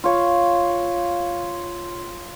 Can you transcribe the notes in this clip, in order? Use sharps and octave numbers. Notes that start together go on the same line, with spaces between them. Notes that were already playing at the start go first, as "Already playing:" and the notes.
F4 C#5